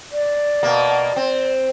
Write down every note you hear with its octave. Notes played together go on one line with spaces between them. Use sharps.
D5
B2 A#3
C4